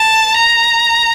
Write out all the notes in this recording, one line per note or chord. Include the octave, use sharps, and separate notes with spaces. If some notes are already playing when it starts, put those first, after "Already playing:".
Already playing: A5
A#5